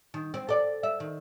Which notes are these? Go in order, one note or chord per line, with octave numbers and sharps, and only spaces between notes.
D#3
C4
A4 D5
E5
D#3